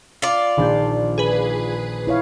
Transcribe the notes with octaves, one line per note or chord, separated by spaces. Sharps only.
F4 D5
A#1 D#3 D4 G6
G#4 B4
E4 C#5 F5